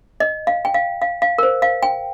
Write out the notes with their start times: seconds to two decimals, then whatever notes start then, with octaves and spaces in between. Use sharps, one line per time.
0.20 D#5
0.47 F5
0.65 G5
0.74 F5
1.02 F5
1.22 F5
1.38 A#4
1.43 C5
1.62 F5
1.83 G5